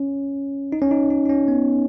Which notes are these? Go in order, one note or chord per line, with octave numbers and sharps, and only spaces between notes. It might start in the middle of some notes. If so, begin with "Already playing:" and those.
Already playing: C#4
D#4
C#4
D#4
D#4
D#4
C#4
B3